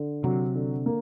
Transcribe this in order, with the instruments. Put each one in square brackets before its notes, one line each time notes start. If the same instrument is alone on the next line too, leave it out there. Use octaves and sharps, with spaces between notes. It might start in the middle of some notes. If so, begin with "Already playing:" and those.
Already playing: [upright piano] D3
[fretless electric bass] C3 [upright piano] F#3
[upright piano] D3
A#3